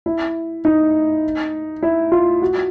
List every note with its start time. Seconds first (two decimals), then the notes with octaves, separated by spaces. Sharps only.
0.06 E4
0.65 D#4
1.83 E4
2.12 F4
2.42 F#4